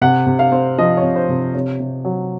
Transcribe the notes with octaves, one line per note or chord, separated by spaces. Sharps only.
C3 F#5
C3
F5
C4
F3 D#5
C#5
C3
C5
C3
C3 C#5
C3
F#3